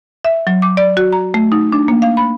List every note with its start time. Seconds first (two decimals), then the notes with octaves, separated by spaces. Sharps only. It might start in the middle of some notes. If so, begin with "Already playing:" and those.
0.24 E5
0.47 F#3
0.62 D6
0.77 D5
0.97 F#4
1.13 A#5
1.34 A3
1.52 D#4
1.72 D4
1.88 A#3
2.02 F5
2.17 B5